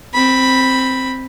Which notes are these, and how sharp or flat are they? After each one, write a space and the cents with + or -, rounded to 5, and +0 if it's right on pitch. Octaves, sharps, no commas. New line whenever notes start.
C4 +0 B5 +0